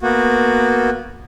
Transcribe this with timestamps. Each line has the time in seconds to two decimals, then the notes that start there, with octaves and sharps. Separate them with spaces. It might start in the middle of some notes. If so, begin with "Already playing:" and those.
0.02 A#3 B3 F#4